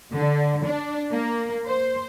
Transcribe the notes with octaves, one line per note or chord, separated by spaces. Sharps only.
D3
D4
A#3
C5